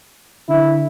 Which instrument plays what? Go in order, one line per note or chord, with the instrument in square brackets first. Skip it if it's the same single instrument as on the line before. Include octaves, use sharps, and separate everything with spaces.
[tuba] D3 [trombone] E4